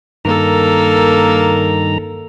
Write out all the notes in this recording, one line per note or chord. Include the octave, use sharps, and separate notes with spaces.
G2 D#3 A#3 A4 A#5